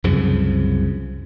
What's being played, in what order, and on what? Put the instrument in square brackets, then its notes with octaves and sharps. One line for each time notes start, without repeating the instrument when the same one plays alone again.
[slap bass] C2 F#2 C#3 F3